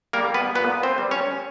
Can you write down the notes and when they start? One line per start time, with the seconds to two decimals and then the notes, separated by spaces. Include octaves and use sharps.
0.13 G3 A#3 A#4
0.34 B3 B4
0.55 A#2 B3 B4
0.83 C4 C5
0.98 G3
1.11 C#4 C#5